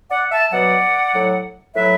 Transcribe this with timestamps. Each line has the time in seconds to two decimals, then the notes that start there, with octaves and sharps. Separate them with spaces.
0.11 D5 F#5
0.32 E5 A5
0.52 B2 F#3 D5 F#5
1.14 A2 F#3
1.76 A2 F#3 B4 E5